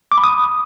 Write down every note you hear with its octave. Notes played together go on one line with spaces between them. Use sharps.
D6
B5
D#6